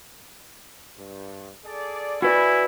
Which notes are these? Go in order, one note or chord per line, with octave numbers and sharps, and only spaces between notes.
G2
G#4 A4 D5
E4 F#4 B4 D5 E5 G#5